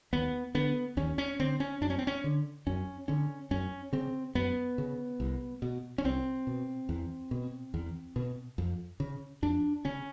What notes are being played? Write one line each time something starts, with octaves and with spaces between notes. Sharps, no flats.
D#2 B3
D3 B3
D#2 C#4
C#4
D3 C4
C#4
F#2 D4
C#4
C4
C#4
D3
F#2 C#4
D3 C#4
F#2 C#4
C#3 C4
F#2 B3
C#3
C2
B2
C#4
C2 C4
B2
E2
B2
E2
B2
F2
C#3
F2 D4
C#3 C#4